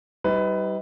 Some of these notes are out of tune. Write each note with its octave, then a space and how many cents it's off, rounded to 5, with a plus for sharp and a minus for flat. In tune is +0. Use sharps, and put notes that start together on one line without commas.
G3 -20 D#4 +35 B4 +20